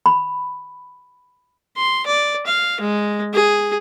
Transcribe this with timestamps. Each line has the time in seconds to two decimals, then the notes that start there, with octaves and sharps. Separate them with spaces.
0.06 B5
1.77 C6
2.06 D5
2.47 F5
2.81 G#3
3.33 G#4